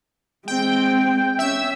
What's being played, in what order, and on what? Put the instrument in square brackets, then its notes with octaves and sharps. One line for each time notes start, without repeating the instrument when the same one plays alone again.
[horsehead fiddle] G#3 C4 [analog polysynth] G5
[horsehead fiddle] C#4 [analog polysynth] E5 E6